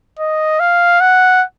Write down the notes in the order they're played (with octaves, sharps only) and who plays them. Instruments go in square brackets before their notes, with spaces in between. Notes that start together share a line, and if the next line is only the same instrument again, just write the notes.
[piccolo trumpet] D#5
F5
F#5